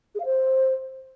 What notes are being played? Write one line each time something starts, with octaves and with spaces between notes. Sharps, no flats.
G#4
F5
C5